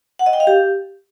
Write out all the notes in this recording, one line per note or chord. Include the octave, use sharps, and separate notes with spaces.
F#5
D#5
G5
F5
G4